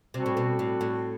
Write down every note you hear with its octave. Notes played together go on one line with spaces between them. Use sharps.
C3 G3 C4 F#4 A4
A2
B2
A2
A2